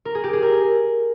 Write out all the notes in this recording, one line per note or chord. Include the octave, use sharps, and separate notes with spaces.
A#4
G#4
G4
G#4
A#4